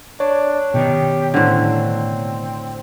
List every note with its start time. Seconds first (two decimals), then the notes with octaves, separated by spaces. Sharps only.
0.20 D4 C#5
0.74 B2 D#3 G4
1.34 A2 D3 C5
1.63 C4